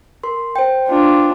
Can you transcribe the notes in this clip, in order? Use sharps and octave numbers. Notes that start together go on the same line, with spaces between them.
A#4 C6
C5 G5
D4 F4